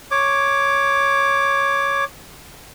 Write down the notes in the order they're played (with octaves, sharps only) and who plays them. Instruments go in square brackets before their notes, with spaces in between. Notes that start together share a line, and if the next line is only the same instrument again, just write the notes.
[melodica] C#5 D6